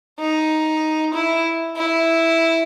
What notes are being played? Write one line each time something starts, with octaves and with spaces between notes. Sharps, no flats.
D#4
E4
E4